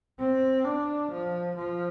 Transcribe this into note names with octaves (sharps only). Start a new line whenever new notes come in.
C4
D4
F3
F3